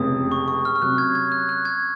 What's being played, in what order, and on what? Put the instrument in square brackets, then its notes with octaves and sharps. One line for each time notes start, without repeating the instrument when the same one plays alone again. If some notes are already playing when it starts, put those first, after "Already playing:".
Already playing: [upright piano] F1 F2 C#3 G#3 [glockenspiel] D#6
[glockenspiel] C#6
C#6
F6
F6
[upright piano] C3 F#3 C#4 [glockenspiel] F#6
[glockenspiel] G#6
G#6
F#6
F#6
G#6